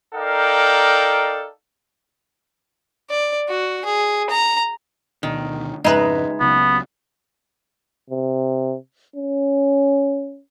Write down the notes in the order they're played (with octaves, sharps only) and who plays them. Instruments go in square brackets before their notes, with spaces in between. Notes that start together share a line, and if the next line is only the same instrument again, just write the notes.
[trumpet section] D#4 A4 A#4 D5 F5 G5
[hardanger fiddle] D5
F#4
G#4
A#5
[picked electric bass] D2 B2 D3 [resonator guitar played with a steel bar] D#3
[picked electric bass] F2 G#2 C#3 [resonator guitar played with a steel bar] G#3 E5 [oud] D#4 B4
[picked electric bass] C#2 C#3 F#3 [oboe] B3
[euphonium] C3
C#4